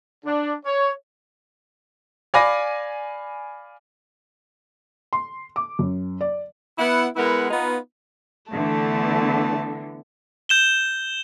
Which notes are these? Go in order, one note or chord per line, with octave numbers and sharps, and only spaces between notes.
D4
C#5
D5 F5 G#5 B5 D6 A#6
C6
D6
F#2
D5
B3 E4 F#5
G#3 B3 E4 A#4 B4 F#5
B3 D#4 F4
D3 E3 A3 B3 A5
G6 E7 G7